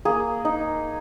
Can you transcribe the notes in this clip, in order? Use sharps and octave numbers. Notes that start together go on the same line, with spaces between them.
A#3 G#4
D#4